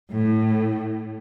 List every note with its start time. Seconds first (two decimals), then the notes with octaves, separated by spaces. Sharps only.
0.10 A2